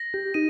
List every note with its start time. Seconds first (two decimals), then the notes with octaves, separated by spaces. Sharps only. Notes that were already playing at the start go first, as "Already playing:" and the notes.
Already playing: A#6
0.14 G4
0.34 D#4 D#7